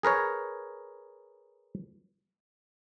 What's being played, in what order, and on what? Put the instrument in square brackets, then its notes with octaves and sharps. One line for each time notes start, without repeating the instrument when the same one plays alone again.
[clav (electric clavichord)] G#4 A#4 B4 C#5